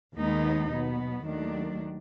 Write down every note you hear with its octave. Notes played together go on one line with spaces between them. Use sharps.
D#2 D#3 G#3 B3 D#4
B2 F#3 B3
D#2 D#3 F#3 A3 D4